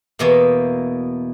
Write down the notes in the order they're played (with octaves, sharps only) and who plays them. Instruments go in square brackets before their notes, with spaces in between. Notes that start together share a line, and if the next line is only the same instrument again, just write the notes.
[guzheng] E2 B2 A#3